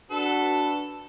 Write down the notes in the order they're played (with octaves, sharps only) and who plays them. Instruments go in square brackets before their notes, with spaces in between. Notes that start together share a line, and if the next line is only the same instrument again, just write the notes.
[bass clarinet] D4 [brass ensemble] F#4 B4 [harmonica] A4